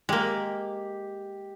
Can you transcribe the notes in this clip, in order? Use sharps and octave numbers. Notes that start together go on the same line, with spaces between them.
G#3 A#3 G4